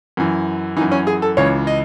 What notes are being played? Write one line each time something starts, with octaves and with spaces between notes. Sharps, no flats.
F#2 E3
F#2 E3 D#4
C#4
G#4
A4
C#2 C#3 E3 C#5
D#5